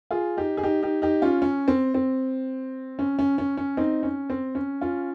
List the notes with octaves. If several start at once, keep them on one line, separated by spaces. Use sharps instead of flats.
F4 G#4
D#4 G4
G#4
D#4 G4
D#4 G4
D#4 G4
C#4 F4
C#4
C4
C4
C#4
C#4
C#4
C#4
C4 D#4
C#4
C4
C#4
C#4 F4